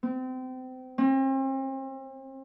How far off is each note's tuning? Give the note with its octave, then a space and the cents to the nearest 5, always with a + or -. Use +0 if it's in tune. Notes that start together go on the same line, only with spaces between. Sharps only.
C4 -30
C4 +40